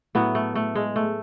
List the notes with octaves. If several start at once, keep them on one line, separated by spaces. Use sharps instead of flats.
A2 F#3 B3
A3
A3
G#3
A3